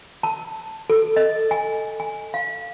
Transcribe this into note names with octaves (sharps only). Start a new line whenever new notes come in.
A5
A4
D#5
G#5
G#5
F5